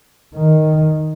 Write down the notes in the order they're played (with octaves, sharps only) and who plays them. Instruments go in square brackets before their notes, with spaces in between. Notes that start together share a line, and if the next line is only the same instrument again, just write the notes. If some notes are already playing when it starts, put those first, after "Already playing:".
[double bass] D#3